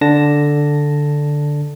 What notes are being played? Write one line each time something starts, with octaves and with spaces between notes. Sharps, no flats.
D3 D4 A5 A#6